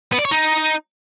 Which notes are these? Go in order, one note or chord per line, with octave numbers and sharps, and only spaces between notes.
B3
D5
C#5
D#4